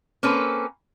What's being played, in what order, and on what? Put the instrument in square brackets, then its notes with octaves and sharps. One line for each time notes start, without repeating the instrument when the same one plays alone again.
[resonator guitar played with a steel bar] A#3 C4 C#4 A4 B4